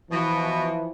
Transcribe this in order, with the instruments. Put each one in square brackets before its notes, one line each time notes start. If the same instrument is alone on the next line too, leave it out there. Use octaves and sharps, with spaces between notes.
[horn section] B2 [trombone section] E3 F3